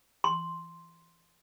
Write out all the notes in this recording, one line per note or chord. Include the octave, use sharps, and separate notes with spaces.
C6